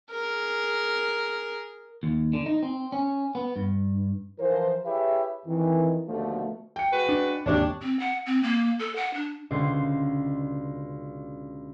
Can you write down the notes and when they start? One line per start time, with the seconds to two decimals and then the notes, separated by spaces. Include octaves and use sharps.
0.11 G#4 A#4
2.03 D#2
2.33 D3
2.46 D#4
2.63 C4
2.92 C#4
3.35 B3
3.56 G2
4.39 E3 F3 A#4 C5
4.85 E4 G4 G#4 B4 C#5 E5
5.46 F2 D#3 E3
6.08 D#2 B2 D3 F3 A3
6.76 G5 C#7
6.92 G#3 F#4 B4
7.09 D4
7.46 G#1 D#2 D4 G4 C#5 D5
7.82 C4
8.00 F#5
8.26 C4
8.43 A#3
8.79 A4
8.96 F#5
9.14 D4
9.51 C#2 B2 D3 C5